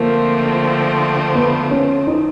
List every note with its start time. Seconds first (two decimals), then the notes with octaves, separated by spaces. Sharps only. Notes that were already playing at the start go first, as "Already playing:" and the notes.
Already playing: D3 F3 A3 A#3 C4
1.35 B3
1.71 C#4
2.07 D#4